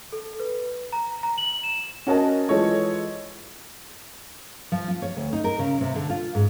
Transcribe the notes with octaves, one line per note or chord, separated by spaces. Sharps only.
A4
B4
A#5
A#5
F#7
E7
C#4 F#4 A#4 D#5 A5
E3 F3 G#3 A4 C#5 D#5
F3
F4
C#5
D2
D#4
A#4
C#3
C3
D3
F4
G#2